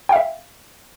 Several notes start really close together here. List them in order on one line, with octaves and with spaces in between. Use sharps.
G5 F5 E5